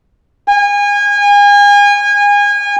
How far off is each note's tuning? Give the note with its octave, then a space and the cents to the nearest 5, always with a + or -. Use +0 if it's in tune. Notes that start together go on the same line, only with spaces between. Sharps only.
G#5 -30